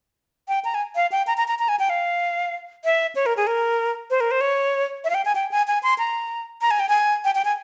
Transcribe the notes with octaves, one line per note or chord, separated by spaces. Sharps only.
G5
A#5
G#5
F5
G5
A#5
A#5
A#5
A#5
G#5
G5
F5
E5
C#5
A#4
G#4
A#4
C5
A#4
C5
C#5
E5
F5
G5
G#5
G5
G#5
G#5
C6
A#5
A#5
G#5
G5
G#5
G5
G5
G#5